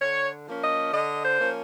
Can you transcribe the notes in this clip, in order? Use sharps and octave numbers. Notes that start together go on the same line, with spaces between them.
D3 C#5
F3 A#3 C#4
D#5
D3 D#5
C5
F3 A#3 C#4